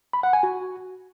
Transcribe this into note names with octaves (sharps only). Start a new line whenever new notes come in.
B5
F#5
G#5
F#4